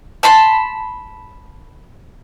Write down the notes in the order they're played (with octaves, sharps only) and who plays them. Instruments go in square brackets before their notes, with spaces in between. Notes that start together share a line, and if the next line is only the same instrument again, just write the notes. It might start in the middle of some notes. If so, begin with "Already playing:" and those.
[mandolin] A5 B5 C6